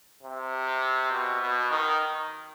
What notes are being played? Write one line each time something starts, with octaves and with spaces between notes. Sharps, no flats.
C3
B2
B2
D#3